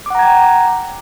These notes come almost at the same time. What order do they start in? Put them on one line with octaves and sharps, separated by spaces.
D6 F#5 A#5 G#6 G5